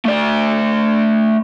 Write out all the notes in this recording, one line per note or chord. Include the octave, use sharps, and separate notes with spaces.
A3 D5